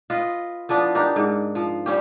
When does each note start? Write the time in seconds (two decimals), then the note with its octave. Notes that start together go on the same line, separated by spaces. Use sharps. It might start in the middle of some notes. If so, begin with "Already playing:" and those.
0.10 F4 B4 D#5
0.69 F3 B3 D4 E4
0.95 D4 D#4 G4 A#4
1.16 G#2
1.55 F3
1.86 G3 C#4 G4